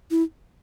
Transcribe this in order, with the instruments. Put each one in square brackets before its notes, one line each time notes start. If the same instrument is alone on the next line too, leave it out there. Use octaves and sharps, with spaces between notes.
[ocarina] E4